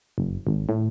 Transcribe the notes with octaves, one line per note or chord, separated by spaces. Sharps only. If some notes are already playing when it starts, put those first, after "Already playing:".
F#1
G#1
A2